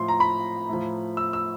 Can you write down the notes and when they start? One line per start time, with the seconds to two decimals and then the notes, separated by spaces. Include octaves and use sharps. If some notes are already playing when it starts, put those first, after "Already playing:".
Already playing: A2 F3 C6
0.08 A#5
0.20 B5
0.69 A2 F3
1.17 E6
1.33 E6